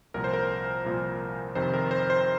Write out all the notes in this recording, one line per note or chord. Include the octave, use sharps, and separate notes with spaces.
C2 A#2 F3 A#4
C5
A#4
C2 A#2 F3
F2 C3 D#3 C5
A#4
C5
C5